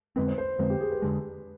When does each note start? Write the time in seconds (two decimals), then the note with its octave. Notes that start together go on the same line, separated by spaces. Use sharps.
0.16 F2 D3 G#3 C4 B4
0.27 C5
0.38 C5
0.59 F2 D3 G#3 C4 B4
0.70 G4
0.81 G#4
0.91 B4
1.02 F2 D3 G#3